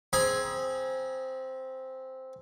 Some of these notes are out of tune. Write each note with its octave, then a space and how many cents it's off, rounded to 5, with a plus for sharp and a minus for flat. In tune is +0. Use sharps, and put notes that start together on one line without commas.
C4 +0 G#4 +0 B5 -45